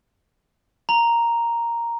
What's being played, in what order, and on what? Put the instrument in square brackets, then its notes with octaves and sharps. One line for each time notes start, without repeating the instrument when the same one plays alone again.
[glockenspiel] A#5